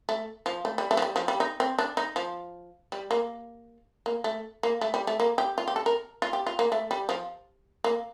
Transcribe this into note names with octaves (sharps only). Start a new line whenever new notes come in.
A3
F3
A3
G3
A3
F3
G3
F3
G3
D#4
C4
D4
D#4
F3
G3
A#3
A#3
A3
A#3
A3
G3
A3
A#3
G4
F4
G4
A4
A#4
F4
G4
F4
A#3
A3
G3
F3
A#3